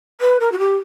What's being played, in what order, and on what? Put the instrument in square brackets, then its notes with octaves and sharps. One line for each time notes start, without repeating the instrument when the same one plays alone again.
[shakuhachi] B4
A#4
F#4
G4